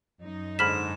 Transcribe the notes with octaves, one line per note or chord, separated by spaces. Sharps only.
F#2 D#4
G#2 D3 B5 F6 B6 E7